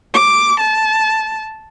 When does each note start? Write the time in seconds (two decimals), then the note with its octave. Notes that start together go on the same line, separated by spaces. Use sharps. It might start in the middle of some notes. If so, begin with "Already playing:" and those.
0.14 D6
0.60 A5